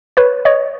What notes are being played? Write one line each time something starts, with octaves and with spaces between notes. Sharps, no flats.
B4 C#5
C#5 D#5